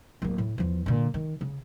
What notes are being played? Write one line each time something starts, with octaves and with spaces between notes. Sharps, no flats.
D1 A#3
A2
E2 F3
A#2 D3
D#3
C#3